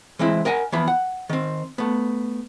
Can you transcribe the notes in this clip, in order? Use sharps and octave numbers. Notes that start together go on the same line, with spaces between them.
E3 G#3 C4 E4
A#4 D#5 F#5 G#5
E3 F3 B3 B5
F#5
D#3 C4
A3 B3